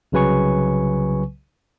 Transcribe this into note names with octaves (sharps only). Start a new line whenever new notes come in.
C2 C#3 F#3 B4 G#5 C#6